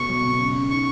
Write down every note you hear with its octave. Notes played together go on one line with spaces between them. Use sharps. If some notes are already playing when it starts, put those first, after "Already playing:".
Already playing: B2 A3 B3 C#6
F#3
B2
C#3
C#3
D#4 C#6